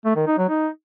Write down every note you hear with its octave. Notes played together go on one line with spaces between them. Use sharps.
A3
D#3
D#4
F#3
D#4